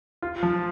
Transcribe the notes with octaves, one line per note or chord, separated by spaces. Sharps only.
F4
F3